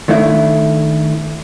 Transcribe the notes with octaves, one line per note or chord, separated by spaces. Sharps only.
D#3 A3 D4 E4